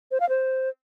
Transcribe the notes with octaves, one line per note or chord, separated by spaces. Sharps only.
C5
F5
C5